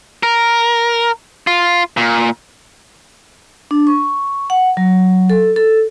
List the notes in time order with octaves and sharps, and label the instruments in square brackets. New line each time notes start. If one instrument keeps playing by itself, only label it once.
[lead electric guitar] A#4
F4
A#2
[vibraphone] D4
C#6
F#5
F#3
A4
A4